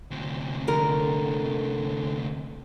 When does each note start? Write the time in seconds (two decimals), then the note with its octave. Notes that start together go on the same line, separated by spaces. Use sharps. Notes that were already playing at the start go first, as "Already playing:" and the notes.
0.11 D2 C3
0.68 D3 A#4